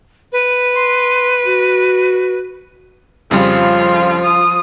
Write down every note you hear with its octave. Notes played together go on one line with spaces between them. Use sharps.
B4
C6
F#4
F2 C#3 F3 G3 F4
D#6